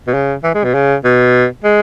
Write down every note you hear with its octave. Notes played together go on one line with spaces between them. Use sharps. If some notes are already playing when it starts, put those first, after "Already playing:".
B2
C#3
E3
G#3
B2
C#3
B2
G#3